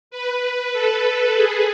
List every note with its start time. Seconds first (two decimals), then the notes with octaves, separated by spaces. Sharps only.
0.11 B4
0.73 A4
1.34 G#4